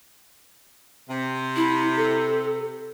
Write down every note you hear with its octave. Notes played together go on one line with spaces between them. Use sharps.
C3
E4
A4